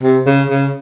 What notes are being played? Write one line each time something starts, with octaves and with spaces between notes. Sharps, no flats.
C3
C#3
C#3